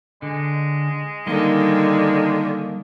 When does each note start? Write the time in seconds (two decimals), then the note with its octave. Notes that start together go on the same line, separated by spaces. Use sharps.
0.22 D3 G#3
1.27 D3 D#3 G3 A#3 D#4 D#5